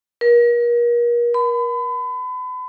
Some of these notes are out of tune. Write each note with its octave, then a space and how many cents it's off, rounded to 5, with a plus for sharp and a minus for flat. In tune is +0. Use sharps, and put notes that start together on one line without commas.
A#4 +35
B5 +35